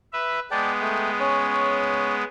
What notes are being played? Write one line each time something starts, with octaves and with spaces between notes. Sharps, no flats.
B4 E5
G#3 B3 D5 G5 A5
A3 G5
C#4 C#5